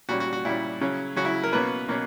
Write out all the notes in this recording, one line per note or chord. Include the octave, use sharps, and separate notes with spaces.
A#2 G3 C#4 F#4
F#4
F#4
A#2 G3 C#4 E4
C#3 F#3 C#4
C#3 F#3 C#4 F#4
E4
A#4
B2 A#3 C#4 B4
B2 A#3 C#4